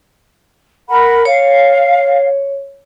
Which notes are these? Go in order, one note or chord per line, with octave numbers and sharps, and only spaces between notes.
A#4 F#5 B5
C#5 F5